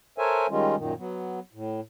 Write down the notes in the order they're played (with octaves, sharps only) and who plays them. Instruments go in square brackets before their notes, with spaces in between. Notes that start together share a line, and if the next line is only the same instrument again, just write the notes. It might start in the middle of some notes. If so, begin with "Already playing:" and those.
[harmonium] A4 A#4 C5 C#5 E5 G#5
D#3 G3 G#3 C#4 F4
F#2 A#2 D#3
F#3 B3
A2